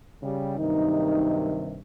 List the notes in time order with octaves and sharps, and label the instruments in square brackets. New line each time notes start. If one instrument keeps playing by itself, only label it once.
[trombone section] C#3 G3 G4
[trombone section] G2 C3 D#3 [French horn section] F#3 A#3 D#4